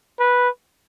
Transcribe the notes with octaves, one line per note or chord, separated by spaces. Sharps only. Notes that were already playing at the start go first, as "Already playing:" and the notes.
B4